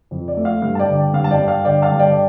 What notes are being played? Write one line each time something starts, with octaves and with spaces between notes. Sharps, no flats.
F2
D5
A3
F5
G2 F5
A5
D5 G5
D3
G2 F5
A5
D5 G5
G2
F5
D3 D5 G5
F5 A5
G2
D5 G5